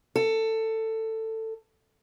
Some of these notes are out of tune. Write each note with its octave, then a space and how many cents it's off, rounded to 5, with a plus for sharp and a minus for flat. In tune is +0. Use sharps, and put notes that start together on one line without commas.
A4 +15